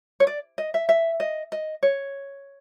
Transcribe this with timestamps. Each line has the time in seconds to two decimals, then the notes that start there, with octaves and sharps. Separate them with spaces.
0.20 C#5
0.27 D5
0.58 D#5
0.74 E5
0.89 E5
1.20 D#5
1.52 D#5
1.83 C#5